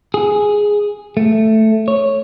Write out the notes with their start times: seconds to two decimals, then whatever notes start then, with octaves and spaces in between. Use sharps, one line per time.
0.14 G#4
1.17 A3
1.88 C#5